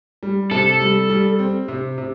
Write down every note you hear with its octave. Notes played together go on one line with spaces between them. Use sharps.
G3
C3 A4
G3
G3
C4
C3
C3